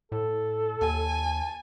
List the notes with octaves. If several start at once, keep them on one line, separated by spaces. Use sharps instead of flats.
A2 A4
D#2 G#5 A5